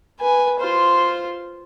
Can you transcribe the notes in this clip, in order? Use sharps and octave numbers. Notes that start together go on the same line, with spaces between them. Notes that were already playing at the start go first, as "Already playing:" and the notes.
B4 G#5
F4 C5